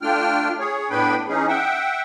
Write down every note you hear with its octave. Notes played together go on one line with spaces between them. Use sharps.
A3 D4 F4 G5 F6
G#4 C#5
A2 B3 D4 B4 G5 B5
E3 C#4 D#4 G#4
E5 F#5 G5